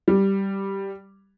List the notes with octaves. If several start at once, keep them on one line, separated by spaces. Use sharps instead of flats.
G3